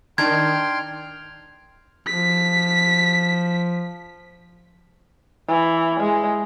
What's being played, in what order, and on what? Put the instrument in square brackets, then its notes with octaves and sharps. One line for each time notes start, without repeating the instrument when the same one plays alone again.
[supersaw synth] D#3 [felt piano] D4 [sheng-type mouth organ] G5 C6 F6 [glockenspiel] G#6
[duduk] F3 [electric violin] B6
[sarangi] E3
G#3